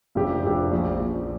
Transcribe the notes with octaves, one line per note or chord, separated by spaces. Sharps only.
F1 F2 F3 D4 G4
F1 F2 F3 D4 G4
A#1 A#2 F3
A#1 A#2 F3